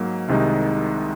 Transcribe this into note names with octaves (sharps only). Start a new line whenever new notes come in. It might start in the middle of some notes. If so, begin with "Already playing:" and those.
Already playing: G#2 F#3 A#3
C2 C3 D#3 G#3 D#4